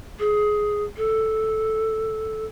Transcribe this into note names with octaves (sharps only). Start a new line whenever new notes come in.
G#4
A4